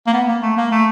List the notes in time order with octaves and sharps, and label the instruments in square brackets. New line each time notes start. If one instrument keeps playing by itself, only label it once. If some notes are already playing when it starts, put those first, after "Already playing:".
[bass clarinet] A#3
B3
A#3
A3
A#3
A3